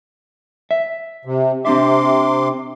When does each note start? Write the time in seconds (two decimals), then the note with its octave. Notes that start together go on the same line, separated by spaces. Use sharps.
0.71 E5
1.25 C3
1.65 C3 C4 D4 E5 C6 D6